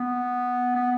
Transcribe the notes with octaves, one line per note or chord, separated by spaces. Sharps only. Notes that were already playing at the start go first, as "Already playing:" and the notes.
Already playing: B3
B3